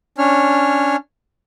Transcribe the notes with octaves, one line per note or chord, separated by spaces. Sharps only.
C#4 D4 C#5 F6